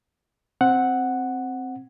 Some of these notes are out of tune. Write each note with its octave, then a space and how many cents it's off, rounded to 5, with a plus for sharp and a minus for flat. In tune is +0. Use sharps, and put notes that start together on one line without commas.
C4 +0 F#5 +0